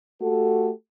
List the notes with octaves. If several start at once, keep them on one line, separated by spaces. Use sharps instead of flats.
A3 F#4 G4 A4